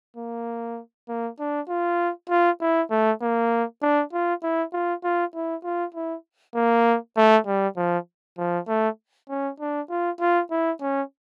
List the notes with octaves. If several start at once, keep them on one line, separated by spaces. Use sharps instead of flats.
A#3
A#3
D4
F4
F4
E4
A3
A#3
D4
F4
E4
F4
F4
E4
F4
E4
A#3
A3
G3
F3
F3
A3
C#4
D4
F4
F4
E4
C#4